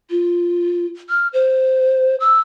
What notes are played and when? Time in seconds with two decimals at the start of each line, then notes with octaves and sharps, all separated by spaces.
0.10 F4
1.09 F6
1.33 C5
2.20 E6